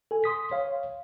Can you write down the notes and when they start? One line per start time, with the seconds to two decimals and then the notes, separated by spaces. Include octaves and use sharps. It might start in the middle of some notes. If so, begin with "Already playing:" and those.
0.11 A4 G#5
0.24 C6 D#6 B6
0.51 C#5 F5